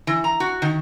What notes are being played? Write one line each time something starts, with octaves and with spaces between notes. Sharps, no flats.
E3
A#5
F#4
D#3